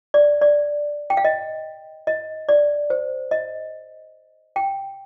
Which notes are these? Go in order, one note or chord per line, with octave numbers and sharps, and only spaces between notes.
D5
D5
G5
F5
D#5
D#5
D5
C5
D#5
G5